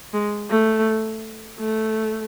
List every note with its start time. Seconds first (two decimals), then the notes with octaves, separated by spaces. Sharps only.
0.13 G#3
0.50 A3
1.59 A3